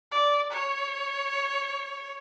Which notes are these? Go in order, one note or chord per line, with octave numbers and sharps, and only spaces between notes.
D5
C#5